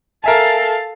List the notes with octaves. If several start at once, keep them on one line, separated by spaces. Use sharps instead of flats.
A4 A#4 E5 F5 G#5 A5